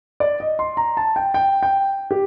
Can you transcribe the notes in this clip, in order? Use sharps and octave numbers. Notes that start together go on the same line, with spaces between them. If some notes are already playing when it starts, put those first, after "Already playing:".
D5
D#5
C6
A#5
A5
G5
G5
G5
G4